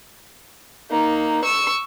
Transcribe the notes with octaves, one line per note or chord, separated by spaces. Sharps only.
A#3 D#4
C#6 E6